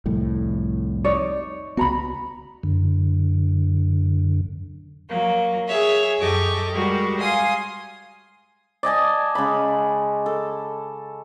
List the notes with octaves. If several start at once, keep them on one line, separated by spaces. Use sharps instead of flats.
C2 F2 A2
D#4 C#5 D5
C#2 B3 F#4 A#5 B5
F#2 D3
F#3 A#3
G#4 C#5 E5
F#2 G4 A4 D#5 C#6 D6
G3 G#3 F#4 G4 A#4
F5 G#5 C6 D#6
D5 D#5 G#5 A5
C#3 G#3 B5
A4